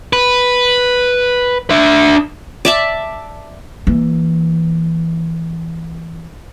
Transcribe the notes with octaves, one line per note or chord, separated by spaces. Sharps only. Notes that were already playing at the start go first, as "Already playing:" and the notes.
B4
D4 E5
D5 E5 A5
E3 A#3